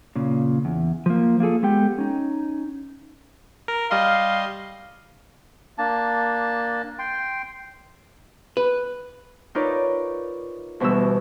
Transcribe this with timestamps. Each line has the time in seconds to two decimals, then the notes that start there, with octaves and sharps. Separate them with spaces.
0.16 A#2 C#3
0.65 E2
1.06 F3 A#3
1.40 A#3 F4 G#4 A4
1.63 G#3 B3 G4 A4 G5
1.98 C#4 D#4
3.68 A#4
3.91 G3 D#5 F5 C6
5.78 A#3 D4 A5
6.99 G5 C6
8.57 B4
9.55 D#4 F4 A#4 B4 C#5 D5
10.80 D2 B2 E3 G3 E6